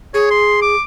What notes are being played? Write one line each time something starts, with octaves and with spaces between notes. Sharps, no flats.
G#4 C#5
C6
D6